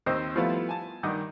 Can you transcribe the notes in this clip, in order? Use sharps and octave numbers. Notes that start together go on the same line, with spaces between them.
D#2 C4 C5 D#5 E6
F3 G3 A3 B3 E4 F4
G#5 A5
G2 D#3 D#5 F#5 D6